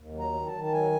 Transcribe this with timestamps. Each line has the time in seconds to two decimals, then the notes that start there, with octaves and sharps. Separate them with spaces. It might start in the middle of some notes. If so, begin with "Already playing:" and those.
Already playing: D#2
0.13 F#3
0.19 A#5
0.33 D#3
0.46 A5
0.53 D#3
0.64 A5
0.72 F#3 G#5